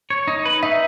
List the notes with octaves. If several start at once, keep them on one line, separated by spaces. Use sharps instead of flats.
C#5
D#4
B4
D#4 E5